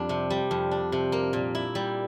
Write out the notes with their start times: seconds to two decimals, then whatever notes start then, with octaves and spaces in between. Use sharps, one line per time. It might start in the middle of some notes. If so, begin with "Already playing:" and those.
Already playing: F2 G3 D4
0.09 C3
0.30 G3
0.51 F2
0.71 D4
0.92 C3
1.12 A#3
1.33 A#2
1.55 E4
1.75 G3